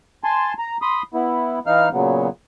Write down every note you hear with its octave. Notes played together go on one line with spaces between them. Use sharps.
G#5 A5 C6
A#5
B5 C6 D#6
B3 E4
E3 D#4 F5 F6
A#2 C#3 F#3 B3